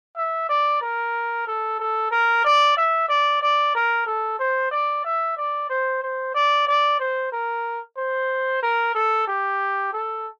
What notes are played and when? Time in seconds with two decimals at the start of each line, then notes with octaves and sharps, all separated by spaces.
0.17 E5
0.49 D5
0.81 A#4
1.47 A4
1.79 A4
2.11 A#4
2.44 D5
2.77 E5
3.09 D5
3.42 D5
3.75 A#4
4.06 A4
4.39 C5
4.71 D5
5.04 E5
5.37 D5
5.70 C5
6.02 C5
6.34 D5
6.67 D5
6.99 C5
7.32 A#4
7.97 C5
8.62 A#4
8.95 A4
9.27 G4
9.93 A4